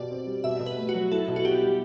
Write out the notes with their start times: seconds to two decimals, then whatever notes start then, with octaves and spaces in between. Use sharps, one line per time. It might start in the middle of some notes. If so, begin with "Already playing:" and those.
Already playing: B2 G4 D5
0.11 C4
0.27 G3
0.44 B2 E5
0.60 B2
0.66 B4
0.77 A3
0.89 F#4
0.94 F#3
1.12 E4 A4
1.28 B2
1.36 F#4
1.45 B3 G4
1.62 G3